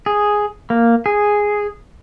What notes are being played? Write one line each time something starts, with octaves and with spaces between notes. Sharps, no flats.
G#4
A#3
G#4